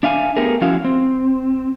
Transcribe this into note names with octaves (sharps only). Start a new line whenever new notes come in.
D4 E5 F5 G#5
A3 B3 G4 G#4 A#4
F3 C#4 E4 F#4 F5
C4